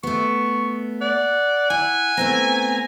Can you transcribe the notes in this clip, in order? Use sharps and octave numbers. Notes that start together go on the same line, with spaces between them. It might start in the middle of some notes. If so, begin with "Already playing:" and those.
A3 B3 C#6
D5 F#5
E4 G#5
A3 B3 C4 A#5